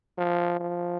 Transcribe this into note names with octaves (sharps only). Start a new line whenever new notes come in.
F3
F3